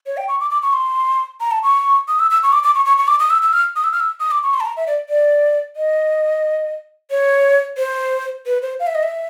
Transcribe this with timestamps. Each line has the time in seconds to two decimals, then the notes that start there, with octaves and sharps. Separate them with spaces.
0.06 C#5
0.17 G5
0.28 C#6
0.40 D6
0.51 D6
0.62 C#6
0.73 C6
1.40 A#5
1.51 A5
1.63 C#6
2.08 D#6
2.19 E6
2.30 E6
2.43 C#6
2.53 D6
2.63 D6
2.75 C#6
2.86 C#6
2.98 C#6
3.08 D6
3.20 D#6
3.30 E6
3.42 E6
3.53 F6
3.76 D#6
3.84 E6
3.93 F6
4.00 E6
4.20 D#6
4.31 D6
4.43 C#6
4.54 C6
4.60 A5
4.65 A#5
4.77 E5
4.87 D5
5.09 D5
5.76 D#5
7.11 C#5
7.78 C5
8.46 B4
8.62 C5
8.80 F5
8.87 E5
8.95 D#5
9.03 E5